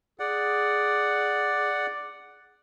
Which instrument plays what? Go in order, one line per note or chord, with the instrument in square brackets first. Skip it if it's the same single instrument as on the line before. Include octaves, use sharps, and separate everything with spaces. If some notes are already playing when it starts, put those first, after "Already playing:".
[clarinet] G#4 [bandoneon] D5 F#5